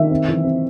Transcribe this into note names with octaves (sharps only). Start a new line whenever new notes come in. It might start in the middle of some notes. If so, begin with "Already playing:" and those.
Already playing: D#3 E5
C4
E3
C4